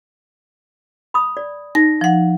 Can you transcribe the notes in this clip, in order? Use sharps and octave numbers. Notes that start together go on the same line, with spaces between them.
B5 D#6
D5
D#4 A#6
F3 F#5